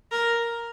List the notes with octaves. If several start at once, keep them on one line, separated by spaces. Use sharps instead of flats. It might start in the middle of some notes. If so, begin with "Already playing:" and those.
A#4